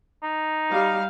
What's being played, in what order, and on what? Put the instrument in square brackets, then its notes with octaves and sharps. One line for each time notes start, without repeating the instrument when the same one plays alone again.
[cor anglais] D#4
[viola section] G3 F5